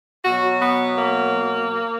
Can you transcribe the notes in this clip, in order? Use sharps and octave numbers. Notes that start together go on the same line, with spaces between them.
B2 F#3 F#4
B3
A#3